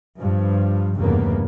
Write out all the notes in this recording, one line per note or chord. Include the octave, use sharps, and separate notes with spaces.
G2 F3
F1 E2 G2 C#3 A#3 B3